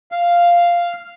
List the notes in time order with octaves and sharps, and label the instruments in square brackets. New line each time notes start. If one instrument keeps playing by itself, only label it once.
[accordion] F5